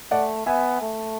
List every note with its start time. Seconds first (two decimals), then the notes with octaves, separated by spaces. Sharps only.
0.11 A3 D5 F#5
0.46 B3 E5 G#5
0.82 A3